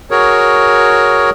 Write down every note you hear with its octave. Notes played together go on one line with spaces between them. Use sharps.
F#4 G#4 A#4 C#5